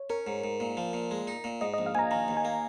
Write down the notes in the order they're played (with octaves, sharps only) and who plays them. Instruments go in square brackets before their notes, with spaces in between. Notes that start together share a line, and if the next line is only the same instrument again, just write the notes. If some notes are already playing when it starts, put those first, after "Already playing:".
Already playing: [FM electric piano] C#5
[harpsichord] C#4 [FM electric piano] A#4
[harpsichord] G#2
G#2
A#2
F3
A#2
G#3
D#4
A#2
[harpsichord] G#2 [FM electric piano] D#5
[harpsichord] A#1 [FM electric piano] D#5
[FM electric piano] F5
[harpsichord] A#1 [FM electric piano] G#5
[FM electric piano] A#5
[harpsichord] D#3 [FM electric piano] A#5
[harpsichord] D#2
[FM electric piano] G#5
[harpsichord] A#3